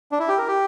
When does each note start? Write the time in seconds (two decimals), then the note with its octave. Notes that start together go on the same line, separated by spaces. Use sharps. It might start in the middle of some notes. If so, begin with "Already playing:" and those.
0.12 D4
0.19 E4
0.28 G4
0.38 A#4
0.48 G4